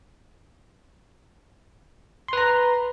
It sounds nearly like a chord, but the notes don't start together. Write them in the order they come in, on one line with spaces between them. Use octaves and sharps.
C6 B4 A#5